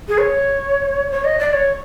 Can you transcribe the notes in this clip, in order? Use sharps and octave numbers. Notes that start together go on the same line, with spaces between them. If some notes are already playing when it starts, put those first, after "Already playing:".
G#4
C#5
C#5
D#5
D5
C#5